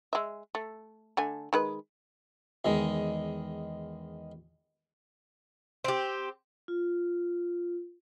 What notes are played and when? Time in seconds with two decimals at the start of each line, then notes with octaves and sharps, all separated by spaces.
0.13 G#3 E5
0.55 A3
1.17 D3 A3 G#5
1.53 D#3 G#3 B4
2.65 E2 D#3 G#3
5.84 C4 G4
6.68 F4